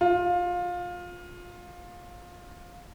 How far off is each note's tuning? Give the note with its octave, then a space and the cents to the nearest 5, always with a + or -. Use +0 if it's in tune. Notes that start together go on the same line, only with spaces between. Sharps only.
F4 +20